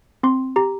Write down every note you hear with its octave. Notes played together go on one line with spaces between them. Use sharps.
C4 C6
G4 A#5